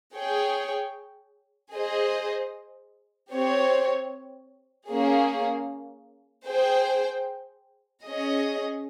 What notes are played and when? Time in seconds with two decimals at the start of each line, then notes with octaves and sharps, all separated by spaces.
0.16 G#4 C#5 G5
1.73 G#4 C5 D#5
3.31 C4 G4 C#5
4.89 A#3 C#4 G#4
6.47 G#4 C5 G5
8.06 C#4 G#4 D#5